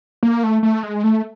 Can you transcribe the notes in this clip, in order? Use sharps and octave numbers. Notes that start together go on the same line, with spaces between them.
A#3
A3
A3
G#3
A3